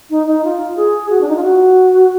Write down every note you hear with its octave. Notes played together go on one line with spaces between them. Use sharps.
D#4
D#4
F4
G#4
F#4
D4
D#4
F4
F#4